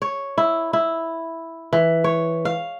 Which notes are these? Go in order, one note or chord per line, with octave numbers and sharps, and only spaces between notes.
C#5
E4
E4
E3
C#5
F5